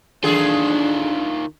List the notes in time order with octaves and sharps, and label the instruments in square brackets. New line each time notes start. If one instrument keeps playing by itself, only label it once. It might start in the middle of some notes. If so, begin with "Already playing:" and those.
[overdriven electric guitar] D#3 F4 [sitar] E3 G#4 A4 [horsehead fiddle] D4